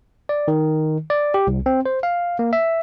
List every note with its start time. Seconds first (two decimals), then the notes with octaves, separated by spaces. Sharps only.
0.29 D5
0.48 D#3
1.10 D5
1.34 G4
1.47 C2
1.66 C4
1.86 C5
2.03 F5
2.39 A#3
2.53 E5